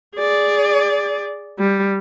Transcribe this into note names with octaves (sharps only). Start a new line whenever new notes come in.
G#4 D5
G3